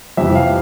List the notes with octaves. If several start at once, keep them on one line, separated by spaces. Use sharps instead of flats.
F2 C3 E3 E5
F5